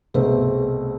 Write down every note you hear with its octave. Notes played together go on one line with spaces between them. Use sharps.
C2 B2 A3 C4 G#4 B4